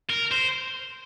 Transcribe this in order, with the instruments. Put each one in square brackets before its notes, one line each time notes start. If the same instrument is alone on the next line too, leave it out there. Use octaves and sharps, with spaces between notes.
[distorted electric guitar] A#4
C5